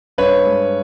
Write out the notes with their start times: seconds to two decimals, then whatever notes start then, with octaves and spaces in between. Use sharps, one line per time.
0.18 G2 B4 C#5
0.46 G#3